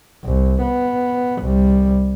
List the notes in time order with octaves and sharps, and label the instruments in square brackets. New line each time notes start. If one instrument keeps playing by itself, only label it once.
[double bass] C2
B3
C2 G3